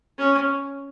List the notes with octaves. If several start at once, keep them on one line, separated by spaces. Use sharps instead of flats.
C#4